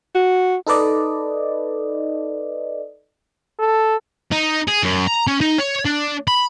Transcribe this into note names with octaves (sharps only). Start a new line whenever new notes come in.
F#4
D#4 A4 B4 D5 D#5
A4
D#4
G#4
F#2
A#5
C#4
D#4
C#5
D4
B5